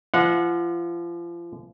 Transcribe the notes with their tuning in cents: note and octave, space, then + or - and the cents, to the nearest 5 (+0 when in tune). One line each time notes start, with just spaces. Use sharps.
F3 -35 F#5 -25